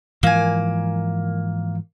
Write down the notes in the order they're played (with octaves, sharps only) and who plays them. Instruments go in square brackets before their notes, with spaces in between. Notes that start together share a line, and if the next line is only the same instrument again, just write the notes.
[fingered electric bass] G#2 E3 F3 [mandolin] A#3 G#5